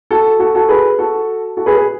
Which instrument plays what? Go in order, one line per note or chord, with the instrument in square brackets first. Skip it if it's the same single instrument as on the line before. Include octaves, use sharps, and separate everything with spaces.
[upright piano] F#4 A4
F#4 A4
F#4 A4
G#4 B4
F#4 A4
F#4 A4
G#4 B4
G#4 B4